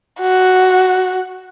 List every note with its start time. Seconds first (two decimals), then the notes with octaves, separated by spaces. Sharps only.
0.20 F#4